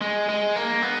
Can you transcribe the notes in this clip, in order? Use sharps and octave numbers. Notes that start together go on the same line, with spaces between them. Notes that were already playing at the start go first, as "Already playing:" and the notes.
G#3
G#3
A#3
B3